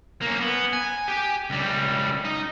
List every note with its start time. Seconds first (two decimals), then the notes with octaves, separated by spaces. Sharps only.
0.22 A#3 C#4
0.40 B3
0.73 G#5
1.08 G4
1.50 C#2 G3
2.25 D#4